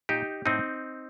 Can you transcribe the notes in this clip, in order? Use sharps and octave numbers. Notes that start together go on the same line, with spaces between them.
A#2 D#4 G4
A2 C4 D#4